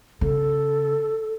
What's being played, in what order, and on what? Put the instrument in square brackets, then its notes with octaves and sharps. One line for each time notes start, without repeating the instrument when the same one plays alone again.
[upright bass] C#3 [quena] A4